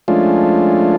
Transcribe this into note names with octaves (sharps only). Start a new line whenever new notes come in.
F3 G#3 A3 C#4 D4 F4